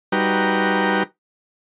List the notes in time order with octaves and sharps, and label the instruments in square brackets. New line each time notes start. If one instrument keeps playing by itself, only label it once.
[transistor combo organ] G3 D#4 F#4 B4 G5 A#5